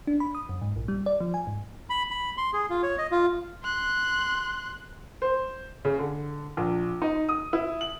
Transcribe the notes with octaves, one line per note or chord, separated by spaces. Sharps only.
D4
B5
D#6
F#2
G#2
A#1
G3
D5
F3
G#5
G#2
B5
B5
C6
G#4
F4
C#5
D#5
F4
C6 F#6
C5
C#3
D3
A#1
D#4
D#6
E4
F#7